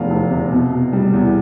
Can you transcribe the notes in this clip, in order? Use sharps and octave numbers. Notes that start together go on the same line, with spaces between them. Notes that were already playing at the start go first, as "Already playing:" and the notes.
Already playing: F1 E2 F5
F1
C3
B2
B2
G3
E2